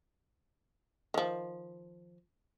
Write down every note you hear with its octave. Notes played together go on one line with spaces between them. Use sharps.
D#3 F3